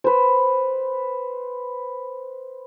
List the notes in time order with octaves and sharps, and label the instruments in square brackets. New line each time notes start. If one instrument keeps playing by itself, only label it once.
[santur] B4 C5